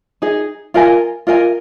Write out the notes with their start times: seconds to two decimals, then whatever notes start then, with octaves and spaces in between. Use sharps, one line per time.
0.22 D#4 G#4 D#5
0.74 F4 A#4 D#5 G#5
1.27 F4 A#4 D#5 G#5